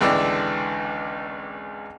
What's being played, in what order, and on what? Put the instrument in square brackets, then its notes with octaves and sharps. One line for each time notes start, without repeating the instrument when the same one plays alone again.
[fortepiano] G#1 C#2 D3 E3 D4 G5